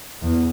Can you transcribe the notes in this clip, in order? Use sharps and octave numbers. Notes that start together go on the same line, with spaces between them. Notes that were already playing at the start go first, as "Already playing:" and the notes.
E2